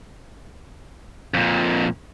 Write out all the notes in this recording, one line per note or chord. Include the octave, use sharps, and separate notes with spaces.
F2 A#2